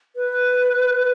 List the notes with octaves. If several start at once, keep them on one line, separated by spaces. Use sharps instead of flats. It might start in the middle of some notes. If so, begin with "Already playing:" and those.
B4